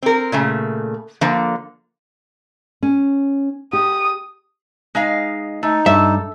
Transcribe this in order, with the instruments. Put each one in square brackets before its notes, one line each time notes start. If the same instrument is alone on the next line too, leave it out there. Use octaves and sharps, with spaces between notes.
[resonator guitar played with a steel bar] C4 A#4
A#2 C#3 A3
D3 F3 A#3
[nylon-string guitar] C#4
[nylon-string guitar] G4 [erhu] D#6
[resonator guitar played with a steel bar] G#3 D#4 F5
[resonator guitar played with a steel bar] A3 [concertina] D#4
[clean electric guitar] G2 [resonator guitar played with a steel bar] A4 [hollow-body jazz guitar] E5